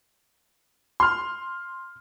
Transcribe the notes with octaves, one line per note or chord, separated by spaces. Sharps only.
C6 F6